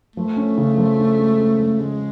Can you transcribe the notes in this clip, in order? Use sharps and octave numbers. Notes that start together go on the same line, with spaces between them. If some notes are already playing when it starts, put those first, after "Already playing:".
F3 A3
C#4
C#3
F3
C#4
G#3
C#4
F3
C#3 G#3